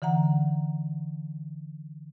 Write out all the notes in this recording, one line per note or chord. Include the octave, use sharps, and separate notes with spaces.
D3 E3 F#5 A#5